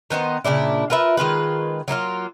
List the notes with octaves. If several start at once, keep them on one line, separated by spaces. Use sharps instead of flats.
D#3 B3 D#4 C5
A#2 C#3 D4 E4
F4 A#4 B4 E5
D#3 G#3 F4 B4
F#3 A#3 D#4 F4